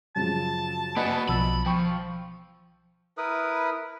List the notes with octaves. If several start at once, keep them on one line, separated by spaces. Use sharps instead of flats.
F#2 C#3 F3 A5
A#3 F#4 B4 D5 D#5 F#5 G#5 B5
B1 B2 F3 B5 E6
F3 G5 C#6
E4 A#4 B4 D#6